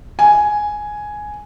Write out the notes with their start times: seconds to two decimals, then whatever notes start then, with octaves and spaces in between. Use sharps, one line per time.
0.19 G#5